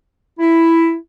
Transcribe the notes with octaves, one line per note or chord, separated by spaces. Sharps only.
E4